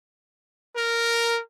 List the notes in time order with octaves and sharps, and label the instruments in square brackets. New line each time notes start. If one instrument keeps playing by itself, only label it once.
[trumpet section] A#4